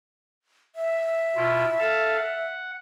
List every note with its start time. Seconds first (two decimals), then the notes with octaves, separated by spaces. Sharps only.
0.76 E5
1.36 B2 E4 F4
1.79 A4 F5 A5
2.17 F#5